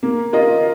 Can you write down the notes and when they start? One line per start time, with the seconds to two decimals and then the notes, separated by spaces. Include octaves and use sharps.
0.03 A#3
0.33 F4 A#4 D#5